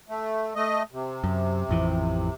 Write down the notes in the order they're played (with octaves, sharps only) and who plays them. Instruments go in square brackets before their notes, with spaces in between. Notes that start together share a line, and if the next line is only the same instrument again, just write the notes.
[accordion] A3
A3 D#5
C3
[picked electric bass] F#2
A1 F2 E3